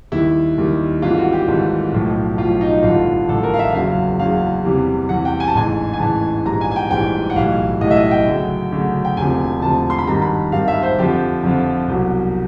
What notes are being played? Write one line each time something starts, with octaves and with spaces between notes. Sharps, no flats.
D#2 D#3 G3 E4
D#2 D#3 G3
G#1 G#2 E3 G3 F4
F#4
G4
G#1 G#2 E3 G3
B1 A2 F3
B1 A2 F3 F4
D#4
A1 G2 D3 F3 F4
A1 G2 D3 F3 A4
A#4
F5
E5
F#1 E2 C#3 F#3 F5
F#1 E2 C#3 F#3 F5
E2 C3 E3 G3
E2 C3 E3 G3 F#5
G5
G#5
A5
A1 G#2 E3 G#5
G#5
A1 G#2 E3 A5
A#1 G#2 E3 G3 A#5
G#5
G#5
G5
A#1 G#2 E3 G3 G5
F#5
B1 A2 E3 G3 F5
B1 A2 E3 G3 D#5
E5
D#5
G5
D2 C#3 F#3
D2 C#3 F#3
G5
E1 D2 C3 F3 G#5
E1 D2 C3 F3 A5
C6
B5
G#1 G2 D#3 G3 A#5
B5
G#1 G2 D#3 G3 F5
E5
C5
F2 D3 F3 G4
F2 D3 F3
C2 B2 F#3